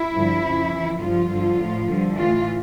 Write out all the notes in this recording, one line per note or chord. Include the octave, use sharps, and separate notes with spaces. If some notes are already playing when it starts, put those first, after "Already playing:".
Already playing: E4
G2 D3 F3
F2 C#3 F3
F2 E3
G2 D3 F3 F4
G2 D3 F3
A2 F3
G2 D3 F3
A2 E3 F4